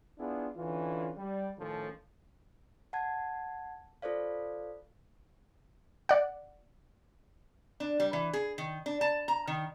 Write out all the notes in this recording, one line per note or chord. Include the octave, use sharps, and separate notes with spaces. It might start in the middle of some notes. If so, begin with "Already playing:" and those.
B3 D4 E4 F4 G#4
D3 E3 C#4 F4
G3
A2 D#3 F3 C#4 A4
F#5 A5 G#6
F4 A4 C5 D5 F5
D5 F#5
D4
G3
E3
G#4
D#3
D4
A5
A#5
D#3